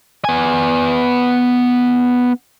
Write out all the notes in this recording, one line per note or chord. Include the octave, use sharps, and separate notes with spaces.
B3 G#5